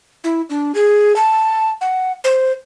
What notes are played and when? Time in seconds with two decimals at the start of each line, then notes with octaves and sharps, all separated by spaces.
0.24 E4
0.50 D4
0.75 G#4
1.16 A5
1.81 F#5
2.24 C5